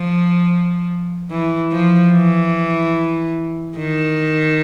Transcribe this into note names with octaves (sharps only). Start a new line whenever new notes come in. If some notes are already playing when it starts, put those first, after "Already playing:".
Already playing: F3
E3
F3
E3
D#3